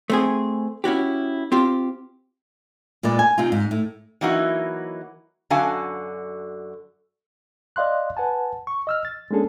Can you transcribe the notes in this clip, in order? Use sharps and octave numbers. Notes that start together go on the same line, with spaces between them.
A3 C4 G#4
C#4 E4 F#4 G4
C4 F4 G4
A#2 G#3 B4 D5
G#5
C3 C4 D#4 F4
G#2
A2
E3 F#3 A#3 D#4 E4 F#4
F#2 D3 F#4 F5 G#5 A5
D5 D#5 F5 C6 F#6
B4 F#5 G#5 A5
C#6
D#5 E6 F6
A6
G#3 A#3 C#4 D4 G#4 A4